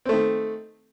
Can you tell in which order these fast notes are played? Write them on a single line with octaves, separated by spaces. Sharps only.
C4 A3 D#3